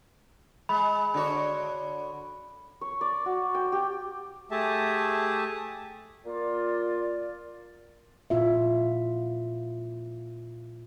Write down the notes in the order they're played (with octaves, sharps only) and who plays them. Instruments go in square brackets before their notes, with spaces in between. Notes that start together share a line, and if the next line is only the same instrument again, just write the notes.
[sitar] G#3 [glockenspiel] B5
[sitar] D3 F#4 C#5
[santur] C#5
D5
F#4
G5
G4
[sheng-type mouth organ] A3 G4 G#4 E5 A5
[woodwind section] A#3 F4 D5
[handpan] A#2 E4 F4 E5